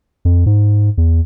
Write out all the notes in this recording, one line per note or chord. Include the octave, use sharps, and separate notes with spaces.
F2
G#2
E2